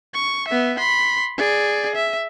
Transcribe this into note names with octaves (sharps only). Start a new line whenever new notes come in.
C#6
B3 E5
B5 C6
G#4 D5
E5